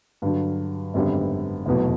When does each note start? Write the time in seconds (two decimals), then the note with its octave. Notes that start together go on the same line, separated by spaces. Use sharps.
0.22 G2 D3 F#3
0.94 G#1 F#2 D3 G3 B3
1.66 F1 E2 B2 F#3